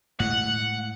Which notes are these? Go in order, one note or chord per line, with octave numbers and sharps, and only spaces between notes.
A2 G#3 F#5